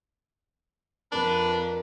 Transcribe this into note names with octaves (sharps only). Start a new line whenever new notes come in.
F2 F3 D4 A#4 B4 A5 A#5